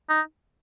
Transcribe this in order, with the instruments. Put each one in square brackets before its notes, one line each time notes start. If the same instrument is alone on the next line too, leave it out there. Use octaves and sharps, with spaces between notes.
[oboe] D#4